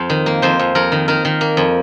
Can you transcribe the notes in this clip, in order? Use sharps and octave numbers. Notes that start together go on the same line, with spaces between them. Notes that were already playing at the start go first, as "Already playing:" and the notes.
Already playing: F2 C5
D#3
A#3
F2 C5
F2
F2 A#4
D#3
D#3 A#4
D#3
A#3
F2